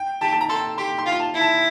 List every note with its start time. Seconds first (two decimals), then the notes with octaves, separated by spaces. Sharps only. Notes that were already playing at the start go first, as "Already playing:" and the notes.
Already playing: G5
0.21 G4 A5
0.32 A5
0.41 A#5
0.49 A4 C6
0.78 G4 C6
0.98 C6
1.06 F4
1.20 A5
1.34 E4
1.41 A5